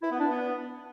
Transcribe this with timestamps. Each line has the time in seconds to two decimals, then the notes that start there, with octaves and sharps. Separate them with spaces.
0.01 E4
0.10 B3
0.19 D4
0.28 B3